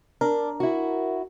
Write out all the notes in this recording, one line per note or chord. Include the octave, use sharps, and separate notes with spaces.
D4 A#4
E4 F#4